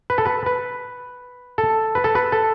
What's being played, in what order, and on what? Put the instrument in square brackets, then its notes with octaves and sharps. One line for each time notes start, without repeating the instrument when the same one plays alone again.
[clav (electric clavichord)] B4
A4
B4
B4
A4
B4
A4
B4
A4